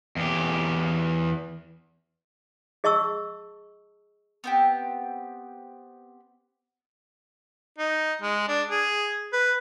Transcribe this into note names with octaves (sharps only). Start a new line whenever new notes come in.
E2 G4
G#4 D#5 A5 C#6 E6
B3 C4 G4
D#4
G#3
D4
G#4
B4